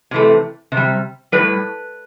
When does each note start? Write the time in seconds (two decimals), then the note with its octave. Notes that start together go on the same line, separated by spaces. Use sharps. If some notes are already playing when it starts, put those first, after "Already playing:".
0.11 C3 E3 A3
0.72 C3
0.77 G3
1.32 A2 G3 B4